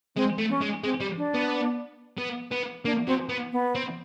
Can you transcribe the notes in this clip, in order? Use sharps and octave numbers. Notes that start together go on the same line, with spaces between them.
G#3 C4
A3
C#4
G#3
G#3 C4
G3
D4
B3
B3
B3
A#3 D4
F#3 C4
B3
B3
C4